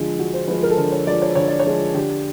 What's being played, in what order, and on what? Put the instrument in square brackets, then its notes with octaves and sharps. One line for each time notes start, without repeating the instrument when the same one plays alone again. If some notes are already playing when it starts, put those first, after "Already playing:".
Already playing: [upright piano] D3 F3 G#3
D3 F#4
C5
F3 G#3 B4
A#4
A4
D3 A#4
C#5
F3 G#3 D5
C#5
D3 C#5
D5
C#5
F3 G#3
D3 G4